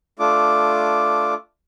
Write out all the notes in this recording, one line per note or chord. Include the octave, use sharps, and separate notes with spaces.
A3 D4 F4 D6